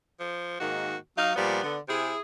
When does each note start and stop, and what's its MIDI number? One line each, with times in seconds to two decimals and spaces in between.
0.20 0.56 53
0.60 0.95 44
0.60 0.95 51
0.60 0.95 58
0.60 0.97 66
1.18 1.31 54
1.18 1.34 63
1.18 1.31 77
1.35 1.59 46
1.35 1.59 53
1.35 1.59 55
1.35 1.75 59
1.63 1.78 50
1.88 2.12 48
1.88 2.19 64
1.88 2.19 68